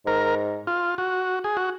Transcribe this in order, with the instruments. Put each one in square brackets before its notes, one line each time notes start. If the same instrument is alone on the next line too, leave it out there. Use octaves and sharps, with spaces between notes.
[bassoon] G#2 [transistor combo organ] A#4
[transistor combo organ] F4
F#4
G#4
F#4